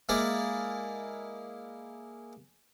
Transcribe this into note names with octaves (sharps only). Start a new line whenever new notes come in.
G#3 A#3 E4 D5